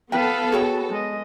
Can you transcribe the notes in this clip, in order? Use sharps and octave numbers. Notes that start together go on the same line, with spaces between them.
B3 A4 B4 F5 G5
F#4 G#4 C#5 G5
G#3 D#5